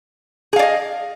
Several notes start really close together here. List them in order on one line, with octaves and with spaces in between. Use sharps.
G#4 F5 D5 D#5